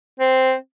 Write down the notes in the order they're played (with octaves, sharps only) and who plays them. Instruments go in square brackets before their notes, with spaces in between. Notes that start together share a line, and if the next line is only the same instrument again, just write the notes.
[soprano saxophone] C4